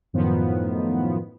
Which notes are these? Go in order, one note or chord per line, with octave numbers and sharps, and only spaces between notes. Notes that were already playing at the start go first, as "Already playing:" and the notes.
F#2 A2 D#3 F3 B3